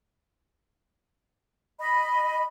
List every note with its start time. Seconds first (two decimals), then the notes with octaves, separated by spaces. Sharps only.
1.79 D#5 B5